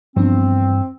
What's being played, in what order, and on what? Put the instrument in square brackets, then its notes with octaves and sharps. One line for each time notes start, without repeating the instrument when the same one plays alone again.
[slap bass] G2 E3 [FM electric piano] F3 B3 D4 [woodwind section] C4